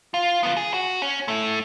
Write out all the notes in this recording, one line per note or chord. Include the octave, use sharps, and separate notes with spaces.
F4
B3 F4
G#4
F#4
C#4
A3 E4